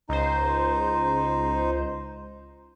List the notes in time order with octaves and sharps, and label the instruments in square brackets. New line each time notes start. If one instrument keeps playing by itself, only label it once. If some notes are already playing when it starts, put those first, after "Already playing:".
[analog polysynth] C#2 C5 [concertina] D#4